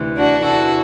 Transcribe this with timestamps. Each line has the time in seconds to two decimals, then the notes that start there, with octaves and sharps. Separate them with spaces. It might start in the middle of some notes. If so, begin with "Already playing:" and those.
Already playing: D2 C3 E3
0.16 D4 F#4
0.44 E2 C3 E3 F#4 A4